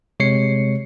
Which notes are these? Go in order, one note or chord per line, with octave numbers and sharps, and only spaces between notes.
C3 G#3 C#5 C7 C#7